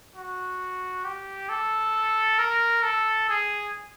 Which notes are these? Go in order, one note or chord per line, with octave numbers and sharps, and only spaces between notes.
F#4
G4
A4
A#4
A4
G#4